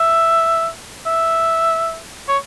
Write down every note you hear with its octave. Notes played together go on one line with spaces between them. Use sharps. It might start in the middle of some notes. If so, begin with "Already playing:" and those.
Already playing: E5
E5
C#5